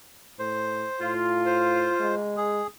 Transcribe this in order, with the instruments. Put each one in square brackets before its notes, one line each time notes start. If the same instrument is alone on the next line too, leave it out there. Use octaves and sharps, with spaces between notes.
[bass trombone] A2 [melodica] C5
[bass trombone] A2 [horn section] F4
[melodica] C5
[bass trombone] G#3
[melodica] G#4